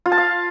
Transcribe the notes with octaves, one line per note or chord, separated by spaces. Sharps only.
F4
A5
F5